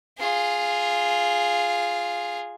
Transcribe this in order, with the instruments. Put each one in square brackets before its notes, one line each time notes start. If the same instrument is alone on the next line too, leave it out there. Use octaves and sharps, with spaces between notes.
[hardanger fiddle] F4 G#4